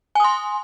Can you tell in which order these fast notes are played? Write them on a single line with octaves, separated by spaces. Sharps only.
G#5 D#6 C6